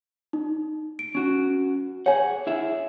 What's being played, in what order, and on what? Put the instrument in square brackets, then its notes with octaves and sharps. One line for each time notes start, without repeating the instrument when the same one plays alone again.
[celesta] D#4
D7
[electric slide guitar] C#4 F#4
[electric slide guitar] G#4 F#5 [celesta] C#5 G#5
[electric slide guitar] E4 G#4 E5